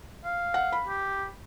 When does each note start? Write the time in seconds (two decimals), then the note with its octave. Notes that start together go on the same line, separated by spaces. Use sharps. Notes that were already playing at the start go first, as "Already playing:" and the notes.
0.25 F5
0.54 F#5
0.72 B5
0.87 G4